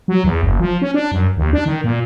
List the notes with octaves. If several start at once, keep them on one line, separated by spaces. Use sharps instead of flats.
F#3
E2
F#1
F3
C#4
D4
F#2
D#2
D4
D#3
A#2